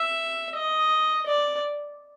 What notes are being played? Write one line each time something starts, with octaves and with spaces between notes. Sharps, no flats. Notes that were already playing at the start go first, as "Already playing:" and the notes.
Already playing: E5
D#5
D5